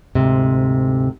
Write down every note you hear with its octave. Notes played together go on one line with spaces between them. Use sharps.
D2 G#2 C3